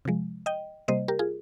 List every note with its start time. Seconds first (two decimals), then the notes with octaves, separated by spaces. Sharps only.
0.05 C3 F3 G#3
0.46 D#5 G5
0.88 C3 G3 A#3 C5 D#5
1.08 G4 A#4
1.19 F4 G#4